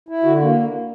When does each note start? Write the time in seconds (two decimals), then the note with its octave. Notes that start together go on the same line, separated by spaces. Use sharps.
0.09 E4
0.24 D3 F#4
0.41 A#3